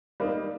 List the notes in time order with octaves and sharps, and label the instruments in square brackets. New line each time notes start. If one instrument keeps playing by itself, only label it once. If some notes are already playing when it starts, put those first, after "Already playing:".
[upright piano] G3 A#3 D#4